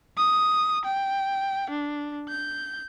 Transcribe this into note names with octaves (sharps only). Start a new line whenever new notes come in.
D#6
G5
D4
G6